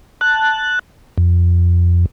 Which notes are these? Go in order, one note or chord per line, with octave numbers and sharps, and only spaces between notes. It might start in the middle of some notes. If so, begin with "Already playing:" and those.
A5 F#6
F2